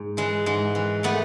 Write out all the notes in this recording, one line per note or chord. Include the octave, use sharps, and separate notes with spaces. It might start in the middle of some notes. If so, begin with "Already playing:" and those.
Already playing: G#2
E3 G#3
G#2 G#3
E3
E3 A3 B3